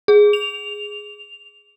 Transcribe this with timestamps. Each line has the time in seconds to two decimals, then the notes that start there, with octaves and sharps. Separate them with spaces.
0.08 G#4
0.33 F7